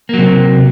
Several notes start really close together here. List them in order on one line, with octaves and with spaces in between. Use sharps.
A#3 F#3 C3